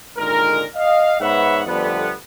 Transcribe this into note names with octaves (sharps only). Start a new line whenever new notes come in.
G#1 A#2 D3 D#3 G#3 A#4
D#5 F5
G#2 B3 B4 C#5 E5 F#5
F2 D3 G3 A3 B3